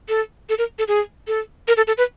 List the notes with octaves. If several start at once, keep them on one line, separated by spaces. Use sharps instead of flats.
A4
A4
A#4
A4
G#4
A4
A#4
A4
A4
B4